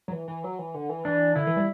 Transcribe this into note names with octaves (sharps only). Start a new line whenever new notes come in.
F#3
E3
E3
F#3
E3
D3
E3
E3 D4
D3 E4
E3
G3